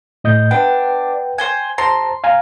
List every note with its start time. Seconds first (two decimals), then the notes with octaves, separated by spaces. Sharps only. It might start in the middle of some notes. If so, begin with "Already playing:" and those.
0.24 A2 D#5 G6
0.51 D4 B4 F#5 G5
1.38 C5 G5 G#5
1.78 C5 A5 A#5 C6
2.24 F5 G#5 A#5